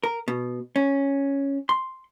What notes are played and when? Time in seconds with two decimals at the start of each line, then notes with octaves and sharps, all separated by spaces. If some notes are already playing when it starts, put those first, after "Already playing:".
0.04 A#4
0.28 B2
0.76 C#4
1.69 C6